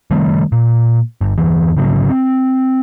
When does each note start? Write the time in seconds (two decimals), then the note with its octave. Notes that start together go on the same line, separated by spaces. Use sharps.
0.11 D#3 G3 A3 C4
0.52 A#2
1.21 G1
1.38 G1 E2 E3
1.77 F#1 G#2 C#3 F#3
2.09 C4